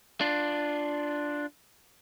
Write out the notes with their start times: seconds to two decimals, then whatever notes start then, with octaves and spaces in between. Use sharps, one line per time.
0.21 D4 F4